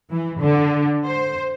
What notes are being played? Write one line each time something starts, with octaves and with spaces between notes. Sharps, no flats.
E3
D3
C5